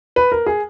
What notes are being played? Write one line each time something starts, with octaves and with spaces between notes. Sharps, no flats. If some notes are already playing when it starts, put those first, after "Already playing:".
B4
A#4
G#4